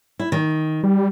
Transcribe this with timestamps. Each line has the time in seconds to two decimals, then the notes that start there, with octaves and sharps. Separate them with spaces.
0.19 E4
0.32 D#3
0.83 G3